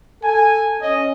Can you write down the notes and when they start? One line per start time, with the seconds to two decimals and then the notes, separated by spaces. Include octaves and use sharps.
0.24 A4 G#5
0.82 C#4 D#5